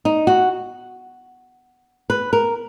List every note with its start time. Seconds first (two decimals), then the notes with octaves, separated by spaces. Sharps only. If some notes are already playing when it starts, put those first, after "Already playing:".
0.05 D#4
0.27 F#4
2.10 B4
2.33 A#4